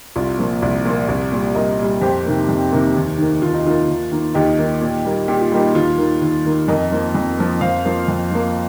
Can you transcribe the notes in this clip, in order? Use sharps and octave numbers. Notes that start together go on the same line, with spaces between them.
C2 F4
A#2 F3 A#3
C2
A#2 F3 A#3
C2
A#2 G3
C2 A#4 D#5
A#2 G3
F2 G4 C5
C3 D#3 A#3
F2
C3 D#3 A#3
D#2
D#3 A#3
D#2 F4
D#4
D#3 A#3 F4
D#2
D#3 A#3
D#2 D#4 G4
D#3 A#3
A#2
G3 A#3
A#2 G4
F4
G3 A#3 D#4 G4
D#2 F4
D#3 A#3
D#2
D#3 A#3
F2 A#4 D#5
F3 A#3
F2
F3 A#3
F2 C5 F5
F3 A#3
F2
F3 A#3